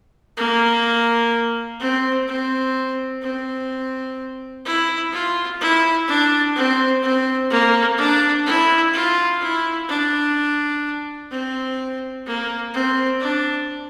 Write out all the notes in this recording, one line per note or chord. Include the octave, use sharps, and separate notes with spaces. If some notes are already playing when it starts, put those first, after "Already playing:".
A#3
C4
C4
C4
E4
F4
E4
D4
C4
C4
A#3
D4
E4
F4
E4
D4
C4
A#3
C4
D4